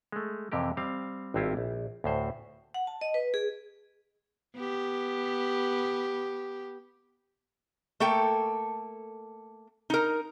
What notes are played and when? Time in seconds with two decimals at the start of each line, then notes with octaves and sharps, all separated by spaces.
0.12 G#3 A3
0.52 F2 C3 E3 G4 A#4
0.77 G3 C4 F5
1.34 G#1 G2 C4 E4 F4 G4
1.57 A#1
2.04 D2 A2 C5
2.74 F#5
2.87 A5
3.01 D#5
3.14 B4
3.34 G#4
4.56 B3 G4
8.00 A3 A#3 A4 G5
9.90 D#4 A#4